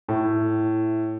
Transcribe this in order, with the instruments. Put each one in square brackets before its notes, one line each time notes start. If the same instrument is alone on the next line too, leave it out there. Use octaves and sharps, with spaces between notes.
[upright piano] A2